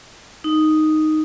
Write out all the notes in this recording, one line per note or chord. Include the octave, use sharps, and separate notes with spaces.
D#4